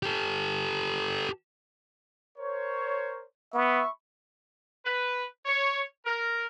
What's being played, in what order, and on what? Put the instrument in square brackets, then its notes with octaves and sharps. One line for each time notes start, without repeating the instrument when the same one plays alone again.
[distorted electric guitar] G4 A4
[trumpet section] A#4 C5 C#5
[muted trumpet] B3 [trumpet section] E5 B5 C#6
[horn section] B4
C#5
A#4